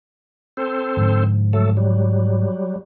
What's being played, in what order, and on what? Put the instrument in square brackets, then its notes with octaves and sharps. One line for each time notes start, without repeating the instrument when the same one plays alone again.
[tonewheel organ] C4 A4 C5
[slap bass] G#2 D3 F3
[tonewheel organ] F#3 A3 A4
F#3 G3